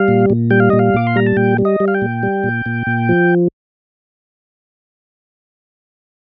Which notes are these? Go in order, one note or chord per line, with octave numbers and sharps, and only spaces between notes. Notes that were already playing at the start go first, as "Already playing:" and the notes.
Already playing: G3 F5
A#2
A#2
G3 G5
F5
A#2 D#5
F5
A#2 D6
C6
G3 A#5
A5
A#2 G5
G3
D#5
G3
F5
G5
A#2
G3
A#2
A#2
A#2
F3